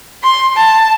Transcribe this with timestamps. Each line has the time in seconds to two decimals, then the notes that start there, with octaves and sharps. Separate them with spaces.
0.23 C6
0.56 A5